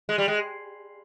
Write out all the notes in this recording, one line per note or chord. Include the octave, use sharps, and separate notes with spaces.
G#3
G3
G#3